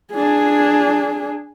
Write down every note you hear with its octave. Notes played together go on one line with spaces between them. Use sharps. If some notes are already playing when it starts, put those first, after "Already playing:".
D4 G#4